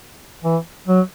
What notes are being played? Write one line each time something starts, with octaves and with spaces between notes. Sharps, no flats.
E3
F#3